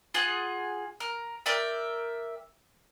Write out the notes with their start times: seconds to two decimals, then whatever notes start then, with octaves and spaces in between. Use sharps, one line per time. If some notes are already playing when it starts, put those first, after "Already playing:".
0.14 F4 G#4 F#5
1.00 A#4
1.46 A#4 D5 E5 G5